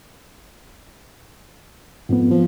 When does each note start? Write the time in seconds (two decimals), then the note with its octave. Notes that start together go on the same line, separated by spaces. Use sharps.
2.09 F2 G#2 B3
2.31 F3